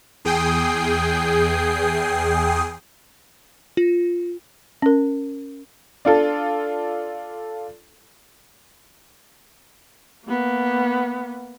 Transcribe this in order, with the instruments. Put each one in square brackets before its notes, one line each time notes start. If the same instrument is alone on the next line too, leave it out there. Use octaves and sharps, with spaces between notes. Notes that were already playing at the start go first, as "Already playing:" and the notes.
[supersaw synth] E2 G#4 G5 D#6 C7
[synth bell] F4
[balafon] C#4 A#4
[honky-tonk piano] D4 F4 A4
[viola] A#3 B3